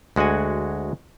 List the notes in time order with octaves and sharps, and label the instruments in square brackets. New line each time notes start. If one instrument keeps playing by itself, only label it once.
[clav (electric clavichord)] D2 G#3 F#4 F#5 G#5